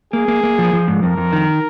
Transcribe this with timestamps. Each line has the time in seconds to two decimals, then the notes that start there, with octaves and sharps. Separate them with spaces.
0.13 A#3 G#4
0.28 A#3
0.43 A#3
0.58 F3
0.73 F3
0.88 G#2
1.03 F2 A#4
1.18 F2
1.33 D#3